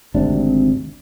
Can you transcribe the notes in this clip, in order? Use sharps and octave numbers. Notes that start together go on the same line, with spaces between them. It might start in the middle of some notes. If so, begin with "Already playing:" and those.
G#1 D2 C3 D4